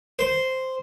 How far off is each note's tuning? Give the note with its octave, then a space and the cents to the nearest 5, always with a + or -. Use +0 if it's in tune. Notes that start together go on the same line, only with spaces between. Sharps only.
C5 -5